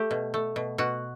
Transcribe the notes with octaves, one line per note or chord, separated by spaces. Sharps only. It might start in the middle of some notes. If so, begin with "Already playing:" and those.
Already playing: A3 G4
B2
A3
B2
B2 F#4